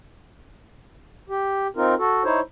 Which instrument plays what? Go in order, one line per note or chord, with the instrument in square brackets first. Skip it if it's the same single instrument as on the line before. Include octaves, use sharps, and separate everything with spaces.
[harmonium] G4
C4 D#4 F4 A#4
F#4 A4
D#4 E4 C5 C#5